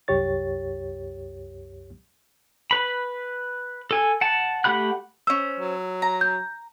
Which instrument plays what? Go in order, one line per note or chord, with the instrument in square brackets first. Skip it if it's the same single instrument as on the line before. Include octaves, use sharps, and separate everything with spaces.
[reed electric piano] C2 F#2 G4 C#5 A6
[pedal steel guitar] B4 B5
A4 G#5
F#5 A5
A3 G4 F#5 B5 F#6
[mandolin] C#4 C5 [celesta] E6
[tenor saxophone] F#3
[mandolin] A#5
[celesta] G6